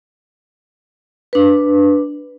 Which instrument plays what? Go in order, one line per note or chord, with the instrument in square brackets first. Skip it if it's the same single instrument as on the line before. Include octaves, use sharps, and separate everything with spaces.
[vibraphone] D4 B4